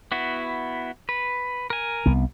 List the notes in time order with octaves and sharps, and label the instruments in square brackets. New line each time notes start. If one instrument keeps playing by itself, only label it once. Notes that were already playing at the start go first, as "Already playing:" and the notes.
[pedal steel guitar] B3 E4 F#4
B4
A#4 G#5
[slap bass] C2 B3